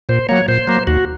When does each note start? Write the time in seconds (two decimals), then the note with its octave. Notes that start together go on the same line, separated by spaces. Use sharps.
0.09 A#2 C5
0.29 F#3 A#3 C#5
0.48 A#2 C5
0.67 F#3 A#3
0.87 D#2 F#4